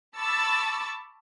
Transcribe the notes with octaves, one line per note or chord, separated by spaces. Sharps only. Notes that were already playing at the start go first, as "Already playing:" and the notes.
A5 B5 C#6 D6 E6 A6